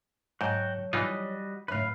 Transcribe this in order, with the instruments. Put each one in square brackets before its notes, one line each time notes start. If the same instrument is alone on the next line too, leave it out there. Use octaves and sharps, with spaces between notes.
[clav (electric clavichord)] G#2 [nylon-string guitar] F#3 A5 [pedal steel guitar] F#4 G5
[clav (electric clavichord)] E3 D#4 F4 [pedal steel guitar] G3 F#4 D#5
[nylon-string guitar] F#2 A2 [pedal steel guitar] B4 F5